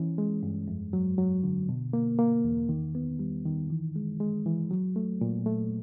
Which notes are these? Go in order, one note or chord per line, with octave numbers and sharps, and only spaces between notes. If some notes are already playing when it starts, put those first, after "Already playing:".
Already playing: E3 C#4
G#3
G2
F2
F#3
F#3
D3
B2
A#3
A#3
E2
D#3
B3
G3
D#3
E3
G#3
G#3
E3
F#3
A3
A#2
A3